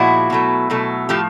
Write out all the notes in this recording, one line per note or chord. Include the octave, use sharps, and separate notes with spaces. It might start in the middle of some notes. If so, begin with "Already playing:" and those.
Already playing: A#2 F3 G#3 E4 F#4
B2 F#3 A3
B2 F#3 A3
A2 F3 A3 F4 G4